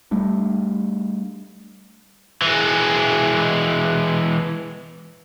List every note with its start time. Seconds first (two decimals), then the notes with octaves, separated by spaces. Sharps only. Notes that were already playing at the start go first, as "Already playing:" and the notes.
0.11 G3 A3 D4
2.42 E3 G#3